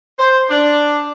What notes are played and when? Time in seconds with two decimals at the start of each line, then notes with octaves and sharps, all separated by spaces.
0.19 C5
0.50 D4